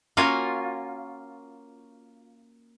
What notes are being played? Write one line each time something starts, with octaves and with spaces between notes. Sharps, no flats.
A#3 C#4 F4 F#4 G#5